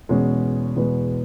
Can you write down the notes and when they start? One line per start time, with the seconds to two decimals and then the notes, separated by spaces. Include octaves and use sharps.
0.09 E2 B2 G#3 C#4
0.76 E2 B2 G#3 B3